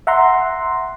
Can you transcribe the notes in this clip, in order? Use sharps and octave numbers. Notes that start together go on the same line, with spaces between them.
E5 F#5 A#5 C6